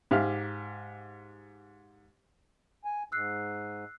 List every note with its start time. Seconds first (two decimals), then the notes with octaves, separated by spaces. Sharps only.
0.11 G#2 G4 F5 F6
2.85 G#5
3.12 G#2 E6 F#6 C7